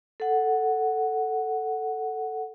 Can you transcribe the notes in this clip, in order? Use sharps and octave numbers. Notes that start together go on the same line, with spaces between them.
A4 F#5